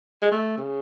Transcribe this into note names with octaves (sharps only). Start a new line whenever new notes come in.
G#3
A3
C#3